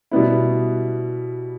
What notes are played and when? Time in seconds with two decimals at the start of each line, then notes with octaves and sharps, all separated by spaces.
0.11 B2 G3 B3 E4